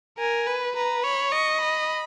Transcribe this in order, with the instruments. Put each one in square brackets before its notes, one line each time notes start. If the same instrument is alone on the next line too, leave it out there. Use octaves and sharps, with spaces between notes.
[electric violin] A#4 [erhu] G#5
[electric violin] B4
[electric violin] B4 [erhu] A#5
[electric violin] C#5 [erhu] B5
[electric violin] D#5 [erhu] C#6
[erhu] B5